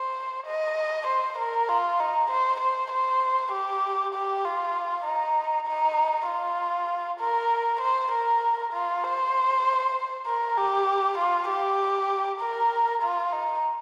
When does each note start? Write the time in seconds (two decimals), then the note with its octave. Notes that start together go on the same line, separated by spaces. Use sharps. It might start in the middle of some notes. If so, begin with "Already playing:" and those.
Already playing: C5
0.47 D#5
1.07 C5
1.38 A#4
1.69 F4
2.00 D#4
2.30 C5
2.60 C5
2.92 C5
3.52 G4
4.14 G4
4.44 F4
5.05 D#4
5.67 D#4
6.28 F4
7.20 A#4
7.81 C5
8.11 A#4
8.73 F4
9.03 C5
10.26 A#4
10.57 G4
11.18 F4
11.49 G4
12.41 A#4
13.02 F4
13.32 D#4